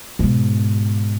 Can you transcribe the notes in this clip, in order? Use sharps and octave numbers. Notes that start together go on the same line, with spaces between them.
G#2 B2